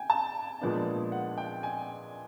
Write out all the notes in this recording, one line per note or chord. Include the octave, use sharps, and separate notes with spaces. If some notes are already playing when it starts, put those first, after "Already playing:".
Already playing: G5 G#5
A5
A#2 F3 G#3 B3 D4
F#5
G5
G#5